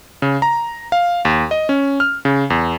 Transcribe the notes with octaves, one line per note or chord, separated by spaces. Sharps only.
C#3
A#5
F5
D#2
D#5
C#4
F6
C#3
E2